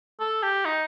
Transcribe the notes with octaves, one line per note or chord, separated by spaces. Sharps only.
A4
G4
D#4